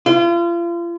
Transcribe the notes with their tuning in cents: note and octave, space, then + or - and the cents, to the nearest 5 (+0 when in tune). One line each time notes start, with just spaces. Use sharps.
F4 -35